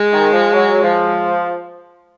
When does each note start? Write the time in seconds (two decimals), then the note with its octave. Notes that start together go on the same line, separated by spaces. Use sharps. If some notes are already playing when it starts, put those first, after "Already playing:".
Already playing: G#3
0.12 D#3
0.32 F3
0.52 F#3
0.82 F3